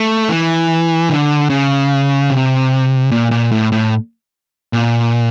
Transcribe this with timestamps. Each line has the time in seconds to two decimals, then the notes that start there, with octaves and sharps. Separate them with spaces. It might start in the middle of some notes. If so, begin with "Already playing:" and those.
Already playing: A3
0.29 E3
1.09 D3
1.50 C#3
2.30 C3
3.11 A#2
3.31 A#2
3.52 A2
3.72 A2
4.73 A#2